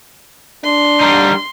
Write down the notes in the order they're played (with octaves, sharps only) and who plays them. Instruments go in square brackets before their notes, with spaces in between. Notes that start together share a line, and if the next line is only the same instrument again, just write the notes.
[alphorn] D4 [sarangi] C6
[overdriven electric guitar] G3 D#4